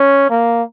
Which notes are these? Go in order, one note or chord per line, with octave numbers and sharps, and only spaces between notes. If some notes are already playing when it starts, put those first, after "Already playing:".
Already playing: C#4
A#3